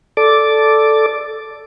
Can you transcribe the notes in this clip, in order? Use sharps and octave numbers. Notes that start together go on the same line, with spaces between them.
A4 D5 D6